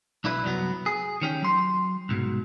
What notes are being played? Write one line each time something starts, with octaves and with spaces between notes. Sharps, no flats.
B1 D4 E4 B4
C2 F#2 F#3 B3
G#4
D#3 C#4 G4
F#3 C6
C2 G#2 B2